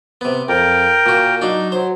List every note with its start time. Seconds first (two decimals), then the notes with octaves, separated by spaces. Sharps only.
0.21 C3 B3
0.49 F2 A#4 G5
1.06 A#2 F#4
1.42 F#3 D4 D#4
1.72 F#3 C5